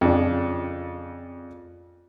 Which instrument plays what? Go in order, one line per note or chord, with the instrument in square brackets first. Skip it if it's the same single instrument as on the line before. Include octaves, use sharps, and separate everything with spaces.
[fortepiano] F2 C#3 D4